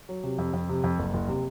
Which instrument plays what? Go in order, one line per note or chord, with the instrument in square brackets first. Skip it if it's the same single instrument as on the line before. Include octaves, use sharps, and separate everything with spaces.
[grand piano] F#3
C3
F2
F2
C3
F2
F#1
F#1
C3